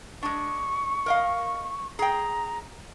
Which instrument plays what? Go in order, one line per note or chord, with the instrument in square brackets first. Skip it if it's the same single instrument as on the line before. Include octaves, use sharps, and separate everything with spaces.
[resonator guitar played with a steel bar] G#3 D4 [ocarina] C#6
[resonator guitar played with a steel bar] A#4 D#5 F5
[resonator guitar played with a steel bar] G#4 G5 [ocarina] A#5